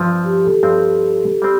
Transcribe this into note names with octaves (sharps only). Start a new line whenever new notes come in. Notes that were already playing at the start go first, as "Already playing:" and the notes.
Already playing: G2 F3 C4
G4
A4
G2 F3 C4
G3 C4 G4